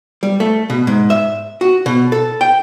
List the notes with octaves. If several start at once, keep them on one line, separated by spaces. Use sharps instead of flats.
G3
A3
B2
G#2
E5
F#4
B2
A4
G5